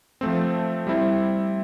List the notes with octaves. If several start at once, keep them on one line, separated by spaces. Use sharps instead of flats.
F3 A3 C4
G3 C4 E4